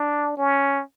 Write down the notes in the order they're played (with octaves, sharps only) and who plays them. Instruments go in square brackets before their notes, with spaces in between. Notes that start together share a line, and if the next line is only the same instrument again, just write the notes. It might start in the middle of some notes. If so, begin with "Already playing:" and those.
Already playing: [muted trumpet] D4
C#4